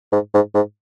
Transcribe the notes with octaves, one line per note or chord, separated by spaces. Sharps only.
G#2
G#2
G#2